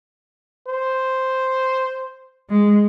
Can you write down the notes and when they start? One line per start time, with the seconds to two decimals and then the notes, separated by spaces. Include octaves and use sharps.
0.68 C5
2.49 G#3